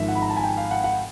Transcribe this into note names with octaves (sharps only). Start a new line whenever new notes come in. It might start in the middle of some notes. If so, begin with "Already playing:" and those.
Already playing: G#1 G#2 F3 E5
F#5
B5
A#5
A5
G#5
G5
F5
F#5
F#5